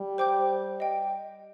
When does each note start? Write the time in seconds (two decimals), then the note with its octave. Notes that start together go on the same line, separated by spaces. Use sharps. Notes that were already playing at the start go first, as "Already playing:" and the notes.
Already playing: G3
0.18 C5 G5 D6 G6
0.80 D#5 G5